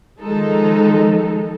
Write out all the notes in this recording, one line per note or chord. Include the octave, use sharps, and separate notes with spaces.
D#3 F3 G#3 D#4 A4